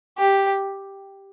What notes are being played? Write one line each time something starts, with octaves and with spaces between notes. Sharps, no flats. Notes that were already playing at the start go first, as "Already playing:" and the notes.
G4